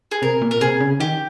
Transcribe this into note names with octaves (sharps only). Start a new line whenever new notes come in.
G#4
C3 A#4
A#2
A#4
C3 G#4
C#3
D#3 G4